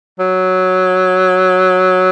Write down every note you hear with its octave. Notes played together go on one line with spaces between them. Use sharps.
F#3